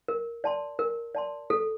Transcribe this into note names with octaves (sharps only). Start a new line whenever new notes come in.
A#4
D5 A5 C6
A#4
D5 A5 C6
A4